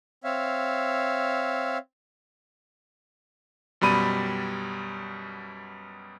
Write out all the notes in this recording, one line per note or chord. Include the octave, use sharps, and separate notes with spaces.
C4 C#5 E5 F5
F#2 B2 G3 B5 D#7